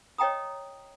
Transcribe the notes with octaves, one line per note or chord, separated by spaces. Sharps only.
C#5 D#5 G5 A#5 D#6